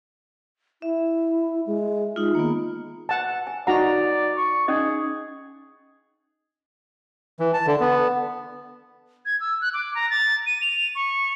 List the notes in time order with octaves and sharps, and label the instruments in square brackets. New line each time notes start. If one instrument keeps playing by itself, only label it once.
[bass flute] E4 [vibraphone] E5
[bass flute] G#3
[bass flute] G#3 [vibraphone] D#4 F4
[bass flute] D#3 [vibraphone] A#3 B3
[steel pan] F#5 A5
[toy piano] G#5
[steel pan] D#4 F#4 A#5 [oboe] D5 [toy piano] F#5
[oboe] C#6
[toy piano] C#4 D#4 D#5 [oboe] G#4
[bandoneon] E3
A5
D3
B3
[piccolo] G#6
E6
F#6
D6
A#5
A6
D#7
F7
C#6